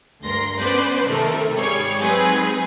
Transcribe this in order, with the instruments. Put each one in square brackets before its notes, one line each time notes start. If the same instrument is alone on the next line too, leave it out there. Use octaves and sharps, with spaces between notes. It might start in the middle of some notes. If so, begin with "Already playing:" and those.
[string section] D2 G2 A#4 C6 A#6 C7
B3 C#4 B4 C5 D5
C3 D#3 A3 A4 A#4
G#2 G3 G#4 C#5 C#6
F#3 G#3 C4 D#4 G#4 B4